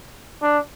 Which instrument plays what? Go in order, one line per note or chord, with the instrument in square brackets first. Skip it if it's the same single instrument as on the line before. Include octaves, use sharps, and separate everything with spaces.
[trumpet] D4